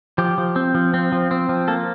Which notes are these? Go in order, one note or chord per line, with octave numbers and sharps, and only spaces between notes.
F3 G4
F3
C4
F3
C4
F3
C4
F3
A#3 A4